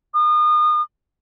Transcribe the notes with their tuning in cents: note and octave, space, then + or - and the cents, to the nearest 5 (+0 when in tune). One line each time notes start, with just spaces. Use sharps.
D#6 -35